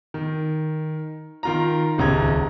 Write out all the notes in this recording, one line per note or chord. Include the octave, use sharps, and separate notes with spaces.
D#3
D#3 F4 A#5
D#1 C#2 A#5 G#6